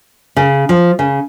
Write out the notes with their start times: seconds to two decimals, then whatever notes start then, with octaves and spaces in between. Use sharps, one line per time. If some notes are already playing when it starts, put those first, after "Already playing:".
0.37 C#3
0.69 F3
0.99 C#3